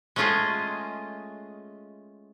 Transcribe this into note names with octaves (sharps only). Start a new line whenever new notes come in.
G#3 A3 C#4 F4 G#4 D#5